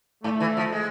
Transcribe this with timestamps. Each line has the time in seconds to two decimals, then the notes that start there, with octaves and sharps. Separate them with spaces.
0.24 G#2 A3
0.40 E3
0.57 F3
0.72 G#3